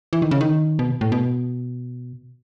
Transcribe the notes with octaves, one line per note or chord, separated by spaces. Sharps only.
E3
D#3
C#3
D#3
B2
A2
B2